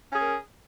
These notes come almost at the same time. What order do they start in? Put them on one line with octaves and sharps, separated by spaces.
C#4 G#4 A#4